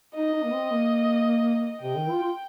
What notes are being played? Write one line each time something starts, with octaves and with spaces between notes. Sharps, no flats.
D#4 D#5
D#4
A#3
C4
A#3
C3 G5
D#3
F4
F4